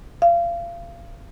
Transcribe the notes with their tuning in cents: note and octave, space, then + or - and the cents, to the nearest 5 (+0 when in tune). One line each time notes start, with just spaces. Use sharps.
F5 -30